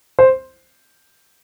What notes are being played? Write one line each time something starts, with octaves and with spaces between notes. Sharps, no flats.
C5